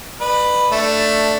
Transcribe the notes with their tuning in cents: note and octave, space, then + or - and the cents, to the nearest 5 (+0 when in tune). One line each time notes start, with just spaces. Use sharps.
B4 +0 D5 +40
A3 +10 D4 +0